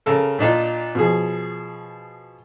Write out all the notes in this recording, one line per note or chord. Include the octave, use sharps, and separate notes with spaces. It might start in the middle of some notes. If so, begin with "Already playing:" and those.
C#3 A4 A#4
A#2 D4 D#4 F4
B2 F3 G#4